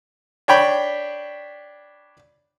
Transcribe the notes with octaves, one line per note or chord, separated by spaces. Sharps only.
D4 C#5 G5 B5